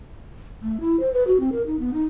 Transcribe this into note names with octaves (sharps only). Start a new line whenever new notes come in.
A3
E4
C5
B4
F#4
C4
A#4
D#4
B3
D#4